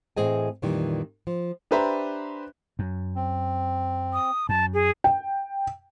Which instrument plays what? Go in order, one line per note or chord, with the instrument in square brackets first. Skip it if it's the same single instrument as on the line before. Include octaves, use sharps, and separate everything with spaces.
[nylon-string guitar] A2 E3 C4 G#4 D#5 G#5
F2 A#2 D#3 E3 G3
F3
[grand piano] D4 G4 B4 C5 E5 A#5
[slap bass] F#2
[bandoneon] C4
[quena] D#6
[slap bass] F#2 [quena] A5
[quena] G#4
[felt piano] G5